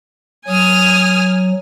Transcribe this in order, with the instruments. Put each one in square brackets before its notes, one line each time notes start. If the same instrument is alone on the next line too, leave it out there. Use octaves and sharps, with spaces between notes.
[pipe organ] F#3 [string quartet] G#5 D#6 F6